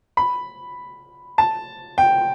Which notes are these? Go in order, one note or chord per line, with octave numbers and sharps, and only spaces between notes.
B5
A5
G5